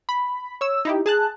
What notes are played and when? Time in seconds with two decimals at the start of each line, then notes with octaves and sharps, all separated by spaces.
0.09 B5
0.61 C#5 E6
0.85 D#4 E4 G4
1.06 G#4 A5 F#6